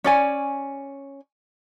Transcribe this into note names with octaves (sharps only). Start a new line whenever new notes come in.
C#4 D5 G#5